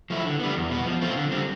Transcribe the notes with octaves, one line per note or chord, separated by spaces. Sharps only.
F3 A3 E4
D3
G3 B3
E2
B2 B3
F3
A3 C4 F4
D3
G3 C4